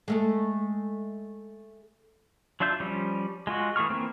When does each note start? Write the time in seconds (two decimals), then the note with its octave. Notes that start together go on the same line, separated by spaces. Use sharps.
0.08 G#3 A3 A4
2.60 F#3 D4 F4 E5 G6
2.80 F3 G3 C#4
3.47 G#3 F4 F#4
3.76 E3 A3 G#4 C#6 F6
3.90 E3 A#3 C4